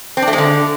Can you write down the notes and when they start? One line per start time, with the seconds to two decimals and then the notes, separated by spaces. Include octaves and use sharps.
0.17 C4
0.22 D4
0.28 A3
0.33 G#3
0.38 D3